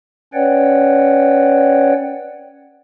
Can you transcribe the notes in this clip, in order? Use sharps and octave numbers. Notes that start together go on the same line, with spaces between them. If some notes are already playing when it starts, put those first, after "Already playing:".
C#4 B4 C#5 D5 F#5 G5